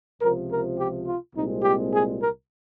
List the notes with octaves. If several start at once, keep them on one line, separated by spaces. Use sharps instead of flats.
C#2 C3 F3 A#4
A#4
G4
F4
C2 A#2 G#3 C4 D#4
G4
G#4
A#4